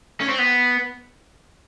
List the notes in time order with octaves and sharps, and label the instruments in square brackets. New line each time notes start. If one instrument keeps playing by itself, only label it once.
[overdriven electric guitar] C#4
C4
B3